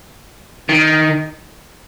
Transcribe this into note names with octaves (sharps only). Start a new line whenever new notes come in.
D#3